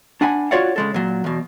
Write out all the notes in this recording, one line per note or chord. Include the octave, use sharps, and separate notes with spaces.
D4 F#5 G#5 B5
F4 F#4 C#5 D5 F5 F#5
C#3 G#3 A4
A#2 F#3
E2 B2